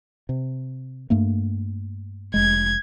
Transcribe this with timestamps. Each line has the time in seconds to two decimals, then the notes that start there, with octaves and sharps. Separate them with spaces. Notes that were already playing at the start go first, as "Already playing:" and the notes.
0.29 C3
1.10 G2 A3 A#3
2.34 F1 G#3 G#6